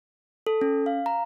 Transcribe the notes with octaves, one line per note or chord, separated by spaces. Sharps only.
A4
C#4
F5
A#5